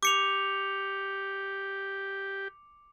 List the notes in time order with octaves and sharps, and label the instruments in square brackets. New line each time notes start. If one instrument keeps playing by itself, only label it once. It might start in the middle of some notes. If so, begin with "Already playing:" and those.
[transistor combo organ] G4 [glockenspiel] D6 C#7 F7